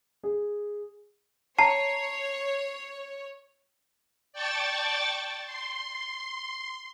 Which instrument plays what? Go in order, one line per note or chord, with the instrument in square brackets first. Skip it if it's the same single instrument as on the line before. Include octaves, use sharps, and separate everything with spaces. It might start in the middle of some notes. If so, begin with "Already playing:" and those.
[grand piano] G#4
[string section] C#5 [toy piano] A5 A#5 [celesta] C7
[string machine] D5 G5 A5 C#6 A6
C6